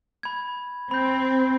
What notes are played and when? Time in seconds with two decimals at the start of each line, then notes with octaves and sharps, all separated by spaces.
0.23 B5 G#6
0.91 C4 B5 G6